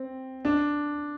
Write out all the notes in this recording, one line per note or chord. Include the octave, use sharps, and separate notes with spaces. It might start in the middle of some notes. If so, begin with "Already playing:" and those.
Already playing: C4
D4